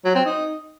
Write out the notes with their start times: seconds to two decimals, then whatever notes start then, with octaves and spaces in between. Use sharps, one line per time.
0.05 F#3
0.15 C4
0.25 D#4